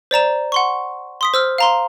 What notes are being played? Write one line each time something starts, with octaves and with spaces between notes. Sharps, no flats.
C5 D5 A#5 E7
F#5 C6 C#6
C6 D#6 B6
C5 E6 F6
F5 A#5 C6